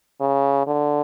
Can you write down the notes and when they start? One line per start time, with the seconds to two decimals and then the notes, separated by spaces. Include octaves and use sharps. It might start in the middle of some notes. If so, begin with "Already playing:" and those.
0.20 C#3
0.67 D3